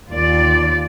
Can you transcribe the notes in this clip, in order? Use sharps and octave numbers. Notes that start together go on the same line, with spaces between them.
D#2 F4 D5